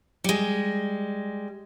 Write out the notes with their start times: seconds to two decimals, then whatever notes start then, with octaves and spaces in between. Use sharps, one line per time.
0.24 G3 G#3